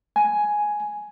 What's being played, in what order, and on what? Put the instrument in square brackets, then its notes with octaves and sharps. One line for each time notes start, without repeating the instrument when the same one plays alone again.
[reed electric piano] G#5